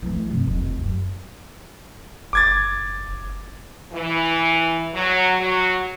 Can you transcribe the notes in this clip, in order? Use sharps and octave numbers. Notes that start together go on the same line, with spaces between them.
E3 A3
G2 C3
F1 D#2
F#2
F#1 D6 G#6 A6
E3
F#3
F#3